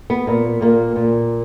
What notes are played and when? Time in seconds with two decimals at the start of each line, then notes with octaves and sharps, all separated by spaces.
0.10 B3
0.27 A#2 A#3
0.61 A#2 A#3
0.96 A#2